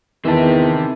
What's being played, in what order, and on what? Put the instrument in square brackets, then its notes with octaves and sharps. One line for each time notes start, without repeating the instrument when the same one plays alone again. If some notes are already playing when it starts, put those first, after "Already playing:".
[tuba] E2 [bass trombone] D#3 [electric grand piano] E3 A5 [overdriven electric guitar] C4 E5